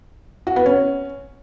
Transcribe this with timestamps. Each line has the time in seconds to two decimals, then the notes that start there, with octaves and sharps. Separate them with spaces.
0.47 F#4
0.56 B3
0.66 C#4